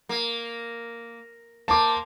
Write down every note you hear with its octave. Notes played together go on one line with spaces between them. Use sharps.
A#3
A#3 C5 A5 D6